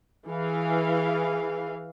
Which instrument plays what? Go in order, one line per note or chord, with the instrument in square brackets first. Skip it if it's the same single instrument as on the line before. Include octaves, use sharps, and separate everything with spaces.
[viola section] E3 F5 [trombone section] G#4